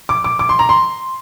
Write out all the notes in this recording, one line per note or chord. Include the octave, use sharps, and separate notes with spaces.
D6
D6
D6
C6
A#5
C6